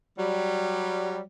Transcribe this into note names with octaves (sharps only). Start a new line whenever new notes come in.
F#3 G3